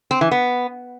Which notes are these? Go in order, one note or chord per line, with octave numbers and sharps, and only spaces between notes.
C4
E3
B3